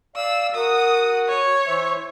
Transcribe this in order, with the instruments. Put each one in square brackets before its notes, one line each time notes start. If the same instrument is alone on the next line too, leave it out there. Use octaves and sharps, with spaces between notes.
[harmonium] D5 F5 [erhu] E6
[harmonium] F#4 A#4 F#5 [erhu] D#6
[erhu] C#5
[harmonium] E3 C5 E5